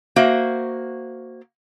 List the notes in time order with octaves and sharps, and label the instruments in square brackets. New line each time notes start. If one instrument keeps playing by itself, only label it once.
[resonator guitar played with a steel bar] A#3 F#4 C5 E5